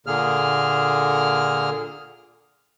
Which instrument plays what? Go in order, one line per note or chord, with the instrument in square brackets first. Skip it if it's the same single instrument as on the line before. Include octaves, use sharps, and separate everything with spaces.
[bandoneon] A#2 D3 A#3 G#4 F6